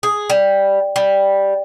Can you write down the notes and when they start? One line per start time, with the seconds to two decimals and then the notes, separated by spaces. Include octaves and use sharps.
0.03 G#4
0.30 G3
0.96 G3